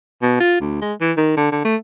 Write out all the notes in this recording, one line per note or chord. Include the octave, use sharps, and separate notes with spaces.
B2
F4
D2
G#3
E3
D#3
D3
D3
A3